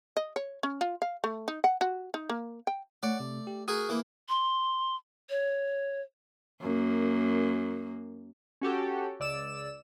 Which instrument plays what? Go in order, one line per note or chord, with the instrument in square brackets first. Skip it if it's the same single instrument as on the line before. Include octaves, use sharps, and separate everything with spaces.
[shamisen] D#5
C#5
C#4
F4
F5
A3
D#4
F#5
F#4
D#4
A#3
G5
[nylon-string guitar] A3 [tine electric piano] C#5 F#5 D6 [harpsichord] D5
[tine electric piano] C3
G4
[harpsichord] F#4 G#4 A#4 [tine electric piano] D#6
[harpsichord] E3 A#3
[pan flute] C6
C#5
[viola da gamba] F#2 A#3
[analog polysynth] C#4 F#4 G4 A4
C#2 D5 E6 E7